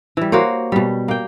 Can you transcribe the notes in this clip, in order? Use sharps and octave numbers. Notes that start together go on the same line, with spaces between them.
E3 G3
A#3 F#4 C5 C#5
B2 G3
A#3 G5